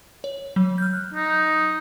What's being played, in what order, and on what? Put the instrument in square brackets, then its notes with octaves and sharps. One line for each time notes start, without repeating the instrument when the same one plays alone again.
[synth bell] C#5
F#3
F6 G6
F#6
[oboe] D#4